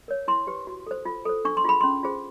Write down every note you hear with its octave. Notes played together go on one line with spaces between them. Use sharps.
A#4 C#5
E4 C6
G4 B4
F#4
A4 C5
F4
A4 C5
D4 C#6
C6
F4 G#4 B5
C#4 C6
F4 G#4 C5